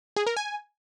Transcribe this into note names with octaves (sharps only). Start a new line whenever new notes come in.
G#4
A#4
G#5